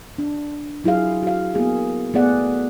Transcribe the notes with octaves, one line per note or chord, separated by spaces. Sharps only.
D4
F#3 E4 F4 G#4 F5
F#4 F5
A#3 B3 G#4
A3 B3 G#4 D5 F#5